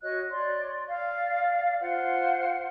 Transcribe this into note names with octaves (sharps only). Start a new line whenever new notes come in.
F#4 C#5 D#5 F#6
C#5 D5 C6
D5 F5
F4 C5 F5 F#5